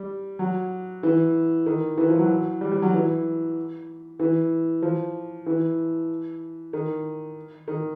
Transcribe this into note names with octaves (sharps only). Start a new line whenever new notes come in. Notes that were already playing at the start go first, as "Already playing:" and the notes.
Already playing: G3
F#3
E3
D#3
E3
F3
F#3
G3
G3
F#3
E3
E3
F3
E3
D#3
D#3